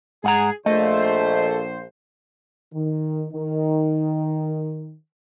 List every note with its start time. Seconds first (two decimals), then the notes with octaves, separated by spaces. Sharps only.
0.24 G#2 G#4 F#5 A#5
0.66 A#1 A3 C5 D#5
2.73 D#3
3.32 D#3